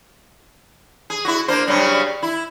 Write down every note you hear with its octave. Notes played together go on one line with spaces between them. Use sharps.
G#4
E4 F#4
A#3 D4 C5
G2 C#3 F#3
E4